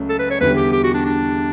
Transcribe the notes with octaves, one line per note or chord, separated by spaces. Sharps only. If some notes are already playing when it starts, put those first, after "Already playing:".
Already playing: C#2 C#3 F#3 A3 C#4
A4
B4
C#5
E2 D3 G3 B4
G4
G4
F#4
D4
D4